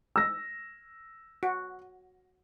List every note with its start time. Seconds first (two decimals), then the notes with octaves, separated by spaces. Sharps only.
0.16 E6 A#6
1.43 F#4